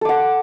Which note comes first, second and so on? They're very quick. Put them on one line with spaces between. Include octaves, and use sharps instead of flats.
A4 D6 F#5